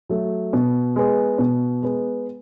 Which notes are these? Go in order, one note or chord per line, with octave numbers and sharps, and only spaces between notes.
F#3 A3
B2
G#3 B3
B2
G#3 B3